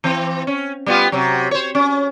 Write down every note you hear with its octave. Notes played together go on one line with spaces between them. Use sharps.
E3 C4
C#4
G3 B3 F4
C3 F#3
C5 C#5
C#4